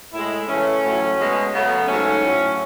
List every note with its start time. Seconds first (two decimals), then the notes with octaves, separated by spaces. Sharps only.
0.14 A2 G#3 E4
0.49 C#3 E3 A3 C#4
0.84 A2 F#3 A3
1.19 B2 G#3
1.53 C#3 F#3 A3 B3
1.88 G#2 F#3 A3 C#4
2.22 A2 F#3 A3